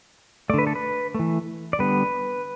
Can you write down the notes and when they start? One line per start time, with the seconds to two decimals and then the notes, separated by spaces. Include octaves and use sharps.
0.50 A3 D5
0.54 D3 B4
0.67 A4
0.75 B4
1.14 E3 A3
1.73 D5
1.79 D3 G3 B3 B4